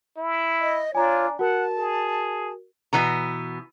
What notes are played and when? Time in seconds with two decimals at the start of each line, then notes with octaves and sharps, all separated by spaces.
0.18 E4
0.60 D#5
0.95 D4 F4 C#5 G#5 A#5
1.39 F#4 A#4 F#5 A5
1.78 G#4
2.93 B2 E3 B3 A#5